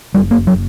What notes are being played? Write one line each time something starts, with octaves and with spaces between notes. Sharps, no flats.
F#1 G3
A#3
F#3